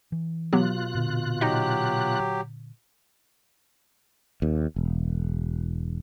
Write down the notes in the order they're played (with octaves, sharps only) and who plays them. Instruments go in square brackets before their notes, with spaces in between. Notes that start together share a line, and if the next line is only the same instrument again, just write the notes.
[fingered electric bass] E3
[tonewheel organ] B2 F4 F#6 [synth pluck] F#3 B3 G4
[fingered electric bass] A#2 D3
[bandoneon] F#3 G4 [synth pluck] D#4 D#5
[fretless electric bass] D#2
E1